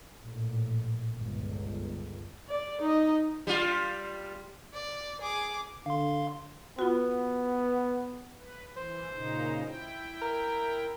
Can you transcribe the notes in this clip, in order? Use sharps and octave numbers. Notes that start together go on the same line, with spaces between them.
A#1 A2
G1 C#2
D5
D#4 D#5
G3 F4
D5
G#4 D6
D3 F5 C6
B3 F4 F#4
B4
E3 C5
A#2 C#3 D#4
E4 G5
A#4